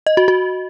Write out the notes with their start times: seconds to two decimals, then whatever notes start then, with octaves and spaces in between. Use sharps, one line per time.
0.07 D#5
0.17 F#4
0.28 F#4